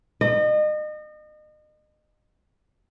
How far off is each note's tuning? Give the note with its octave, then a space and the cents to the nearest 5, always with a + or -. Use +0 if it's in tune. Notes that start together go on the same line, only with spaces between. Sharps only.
D#5 -35